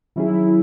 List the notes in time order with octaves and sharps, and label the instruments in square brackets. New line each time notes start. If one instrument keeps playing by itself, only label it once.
[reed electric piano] D#3 F#3 C#4 G#4 [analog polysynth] E4